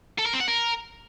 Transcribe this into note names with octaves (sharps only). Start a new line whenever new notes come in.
A4
A#4
C4
F#5
A#4